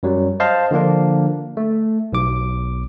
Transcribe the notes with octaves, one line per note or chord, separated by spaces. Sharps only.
F#2 F#3 G3
C5 D#5 F5 A5 C6
D3 F3 A#3 D4
A3
B1 D6